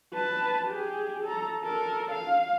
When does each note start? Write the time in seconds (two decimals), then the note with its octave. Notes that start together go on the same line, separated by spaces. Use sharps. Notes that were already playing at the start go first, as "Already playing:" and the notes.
0.14 B4 A5
0.68 G4 G#4
1.24 A4 A#5
1.61 A4 A#4
2.11 F5